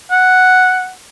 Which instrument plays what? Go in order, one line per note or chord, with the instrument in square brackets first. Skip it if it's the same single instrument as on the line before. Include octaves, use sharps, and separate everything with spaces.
[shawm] F#5